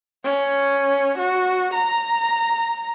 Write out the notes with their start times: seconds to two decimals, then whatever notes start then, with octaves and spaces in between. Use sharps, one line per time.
0.24 C#4
1.18 F#4
1.74 A#5